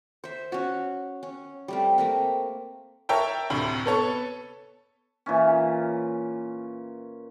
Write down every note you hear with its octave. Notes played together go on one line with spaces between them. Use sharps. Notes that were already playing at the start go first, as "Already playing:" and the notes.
C5 E5
C#4 F#4
C#4
G3 A3 C4
A3 A#3 C4
A#4 C#5 E5 G5 A5
D2 A2 C3
B3 A4 C#5
A#2 E3 C#4